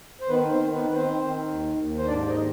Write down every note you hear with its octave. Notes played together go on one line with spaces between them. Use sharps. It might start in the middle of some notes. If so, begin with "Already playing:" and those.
C5
D#3 B3 B4
C4 C5
D#3
B3 B4
D#3 B4
C4 C5
D#3
D#2
D#2
C5
G#2 D4 D5
D#4 D#5
D#3